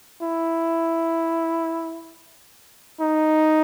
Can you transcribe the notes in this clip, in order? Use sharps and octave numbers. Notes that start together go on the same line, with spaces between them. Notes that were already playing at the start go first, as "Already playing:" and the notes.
E4
D#4